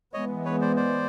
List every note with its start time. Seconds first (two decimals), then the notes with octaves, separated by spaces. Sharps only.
0.14 E3 G#3 B3 C#5 D#5
0.45 B4 C#5
0.61 C5 D5
0.76 C5 D5